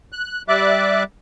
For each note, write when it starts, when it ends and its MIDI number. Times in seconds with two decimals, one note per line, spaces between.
0.12 0.42 90
0.48 1.03 55
0.48 1.03 74
0.48 1.03 76
0.48 1.03 86
0.48 1.03 90